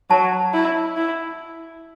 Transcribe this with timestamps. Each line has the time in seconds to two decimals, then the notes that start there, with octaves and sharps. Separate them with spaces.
0.10 F#3 A5
0.54 E4
0.97 E4